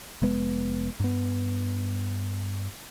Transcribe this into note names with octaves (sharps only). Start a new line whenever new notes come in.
F1 G#3 B3
G2 B3